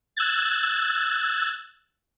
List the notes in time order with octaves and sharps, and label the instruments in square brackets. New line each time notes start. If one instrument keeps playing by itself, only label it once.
[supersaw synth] E6 F#6 G#6 A6